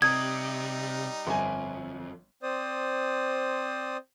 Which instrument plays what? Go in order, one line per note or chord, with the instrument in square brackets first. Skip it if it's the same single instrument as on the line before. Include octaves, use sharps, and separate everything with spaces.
[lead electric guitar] C3 [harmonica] G3 D#4 [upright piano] D#6 [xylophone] G#6
[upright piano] G1 G#5 [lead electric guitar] F2
[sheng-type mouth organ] C4 C5 D5 D#6